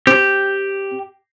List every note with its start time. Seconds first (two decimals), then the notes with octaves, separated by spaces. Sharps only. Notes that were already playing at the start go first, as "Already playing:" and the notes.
0.07 C4 G4